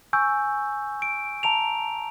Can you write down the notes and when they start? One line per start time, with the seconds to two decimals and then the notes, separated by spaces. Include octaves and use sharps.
0.13 G#5 C#6 E6 G6
1.02 D7
1.43 A5 A#5 D7 F7